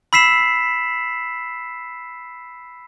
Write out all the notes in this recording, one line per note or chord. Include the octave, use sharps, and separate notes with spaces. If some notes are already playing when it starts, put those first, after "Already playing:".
B5 E6 B6 C7 E7